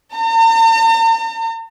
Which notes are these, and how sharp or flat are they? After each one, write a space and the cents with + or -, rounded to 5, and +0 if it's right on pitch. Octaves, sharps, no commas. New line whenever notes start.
A#5 -45